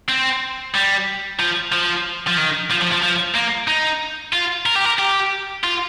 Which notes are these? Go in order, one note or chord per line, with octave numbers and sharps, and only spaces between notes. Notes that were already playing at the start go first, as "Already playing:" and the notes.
C4
G3
F3
F3
F3
D#3
F3
F3
F3
F3
A#3
D#4
F4
A#4
G4
A#4
G4
F4